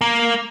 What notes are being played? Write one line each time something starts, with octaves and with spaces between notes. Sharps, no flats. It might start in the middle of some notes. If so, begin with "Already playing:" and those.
A#3